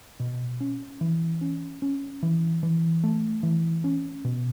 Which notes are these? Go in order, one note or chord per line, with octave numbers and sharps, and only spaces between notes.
B2
C#4
E3
C#4
C#4
E3
E3
A3
E3
C#4
B2